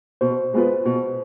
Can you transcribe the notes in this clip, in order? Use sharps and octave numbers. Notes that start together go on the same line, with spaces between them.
B2 C5
G#3 B3 F4 B4
B2